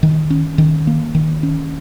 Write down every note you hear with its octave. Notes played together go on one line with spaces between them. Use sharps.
D#3
C#4
D#3
A#3
D#3
C#4